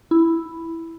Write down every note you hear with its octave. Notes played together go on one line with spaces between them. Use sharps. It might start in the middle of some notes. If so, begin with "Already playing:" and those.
E4